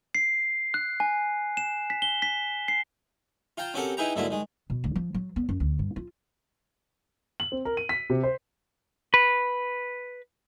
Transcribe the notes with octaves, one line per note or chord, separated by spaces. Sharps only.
C7
F#6
G#5
E7
B6
G7
B6
C7
F4 F5 G5 A5 A#5
C4 C#4 F#4 G4 A4 A#4
D#4 E4 G#4 B4 G5 A#5
G#2 D3 F#3 A#3 E4 F4
D#3 G#3
B2
D2
F3
F#3
B3
F#2
D2
G2
F4
F#7
C4
A#4
D#7
B6
C3
C5
B4